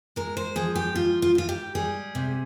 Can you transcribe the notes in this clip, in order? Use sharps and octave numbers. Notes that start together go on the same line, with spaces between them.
G#3 A#4
C5
F3 G#4
G4
G#2 F4
F4
G#2 F4
G4
G3 G#4
C3